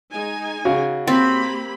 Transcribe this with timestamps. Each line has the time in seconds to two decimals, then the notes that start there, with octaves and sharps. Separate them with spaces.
0.12 G#3 D#4 G#5
0.65 C#3 F#4
1.07 A#3 C4 G4 B5